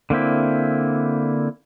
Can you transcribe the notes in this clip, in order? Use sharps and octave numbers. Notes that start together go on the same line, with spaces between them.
D3 A#3 C4 E4